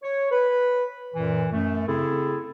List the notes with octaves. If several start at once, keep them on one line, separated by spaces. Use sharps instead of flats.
C#5
B4
F#2 A#2 E3
F#2 A3
C#3 C4 E4 G#4 A4